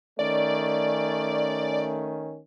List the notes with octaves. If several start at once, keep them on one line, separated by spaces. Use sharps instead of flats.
D#3 A3 C#4 D5